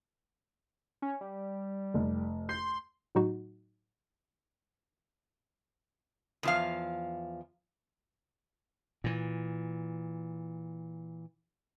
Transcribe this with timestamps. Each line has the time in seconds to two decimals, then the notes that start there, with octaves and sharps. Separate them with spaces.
1.02 C#4
1.21 G3
1.94 F1
2.49 C6 G6 C7
3.15 A2 F#3 D#4 F#4
6.43 E2 F3 F5
9.04 A#2 E3